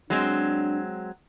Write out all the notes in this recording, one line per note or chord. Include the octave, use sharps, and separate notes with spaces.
F#3 G#3 C4 D4